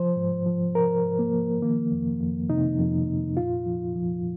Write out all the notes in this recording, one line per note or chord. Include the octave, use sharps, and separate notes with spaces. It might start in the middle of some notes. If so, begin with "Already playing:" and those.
Already playing: F3 C5
G#2
F3
F3 A#4
G#2
A#3
F3
D#3 A#3
F2
F2
C3 D#4
F2
F2
A#2 F4
F3
F3